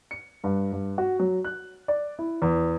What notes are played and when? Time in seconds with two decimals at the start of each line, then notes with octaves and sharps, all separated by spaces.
0.11 C#7
0.44 G2
0.73 G2
0.98 F#4
1.19 F#3
1.45 F#6
1.88 D5
2.19 E4
2.42 E2